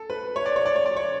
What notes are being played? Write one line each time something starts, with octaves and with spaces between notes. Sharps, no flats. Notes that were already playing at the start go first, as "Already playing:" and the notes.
Already playing: A4
B4
C#5
D5
C#5
D5
C#5
D5
C#5